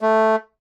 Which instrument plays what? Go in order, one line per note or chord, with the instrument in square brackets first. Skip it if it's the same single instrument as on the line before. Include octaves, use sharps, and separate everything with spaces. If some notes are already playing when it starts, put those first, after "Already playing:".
[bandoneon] A3